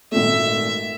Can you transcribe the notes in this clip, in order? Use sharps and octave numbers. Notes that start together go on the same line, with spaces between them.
G#1 A#2 A3 E5